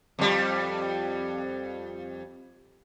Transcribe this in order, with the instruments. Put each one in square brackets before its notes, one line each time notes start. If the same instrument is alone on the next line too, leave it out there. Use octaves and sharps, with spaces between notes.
[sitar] F2 G3